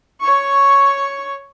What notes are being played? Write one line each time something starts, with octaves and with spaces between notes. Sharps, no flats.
C#5 C#6